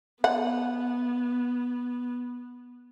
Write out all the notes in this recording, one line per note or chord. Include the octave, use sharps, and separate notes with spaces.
B3 F#5